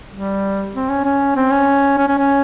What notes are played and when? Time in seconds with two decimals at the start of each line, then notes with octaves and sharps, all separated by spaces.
0.12 G3
0.74 C4
0.90 C#4
1.05 C#4
1.37 C4
1.51 C#4
1.98 C#4
2.08 C#4
2.19 C#4